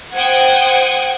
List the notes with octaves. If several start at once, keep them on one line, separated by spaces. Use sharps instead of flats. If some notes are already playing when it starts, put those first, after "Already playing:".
C5 F#5 G5 D#6 G#6